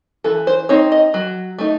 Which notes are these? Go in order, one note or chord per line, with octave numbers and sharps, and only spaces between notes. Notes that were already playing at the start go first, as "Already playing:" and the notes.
E3 A4
C5
C4 D#4 C#5
D#5
F#3
A3 D#4